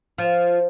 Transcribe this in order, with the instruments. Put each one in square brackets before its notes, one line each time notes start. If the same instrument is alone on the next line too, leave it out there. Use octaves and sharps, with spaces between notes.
[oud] F3